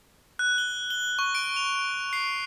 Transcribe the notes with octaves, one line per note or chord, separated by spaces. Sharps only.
F#6
G7
G7
C#6
D7
F7
C7